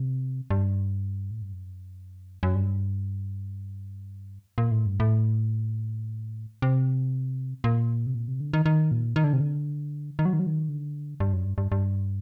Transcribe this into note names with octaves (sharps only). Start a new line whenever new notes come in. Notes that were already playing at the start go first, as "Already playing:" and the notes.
Already playing: C3
G2
A2
G2
F#2
F#2
G2
A#2
A2
G2
A2
C3
A#2
C3
A#2
C3
D3
D#3
D#3
A#2
D#3
D3
C3
D3
D#3
F#3
D#3
F#3
D#3
D3
G2
F#2
G2
G2
G2